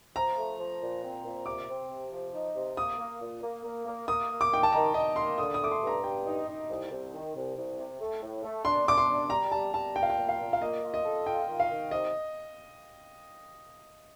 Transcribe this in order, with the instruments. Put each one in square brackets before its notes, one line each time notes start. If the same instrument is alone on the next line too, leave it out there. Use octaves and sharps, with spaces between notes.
[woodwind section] F3 [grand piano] A#5
[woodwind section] A3
F3
A#2
C4
A#2
[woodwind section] C3 [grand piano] D6
[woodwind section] C4
C3
F3
D#4
C3
[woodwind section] A#3 [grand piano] D#6
[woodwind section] A#3
A#2
A#3
A#3
A#3
[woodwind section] A#3 [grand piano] D#6
[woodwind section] A#3
[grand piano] D6
[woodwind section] D#3 [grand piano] G5
[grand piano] A5
[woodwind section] D#3 [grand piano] A#5
[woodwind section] D#3 [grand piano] D#5
[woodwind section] A#3 [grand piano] C6
[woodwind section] D3 [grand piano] D#6
[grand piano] D#6
[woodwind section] A3 [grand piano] D6
[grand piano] C6
[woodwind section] G2
[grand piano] A#5
[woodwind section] G2 [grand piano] G5
[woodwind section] D#4
D#4
C2
C2
D#3
C2
C2
C3
A3
A2
A3
[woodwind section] D4 [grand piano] C6
[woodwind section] D4 [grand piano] D6
[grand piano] C6
[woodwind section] D4
[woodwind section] G3 [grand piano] A#5
[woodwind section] G3 [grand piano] A5
[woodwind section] G3 [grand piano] A5
[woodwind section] A#2 [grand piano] G5
[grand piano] F5
G5
[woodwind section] A#2
[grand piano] F5
[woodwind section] A#2
[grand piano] F5
[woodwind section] A#3 [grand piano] D#5
[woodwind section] F4
[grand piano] D#5
[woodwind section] A4
[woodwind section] F4 [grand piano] G5
[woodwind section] D#3
[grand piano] F5
[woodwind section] D#3
[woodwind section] C3 [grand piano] D#5